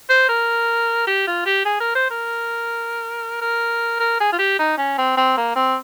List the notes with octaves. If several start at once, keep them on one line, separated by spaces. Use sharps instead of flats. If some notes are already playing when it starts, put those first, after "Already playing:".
C5
A#4
G4
F4
G4
G#4
A#4
C5
A#4
A#4
A#4
G#4
F4
G4
D#4
C#4
C4
C4
A#3
C4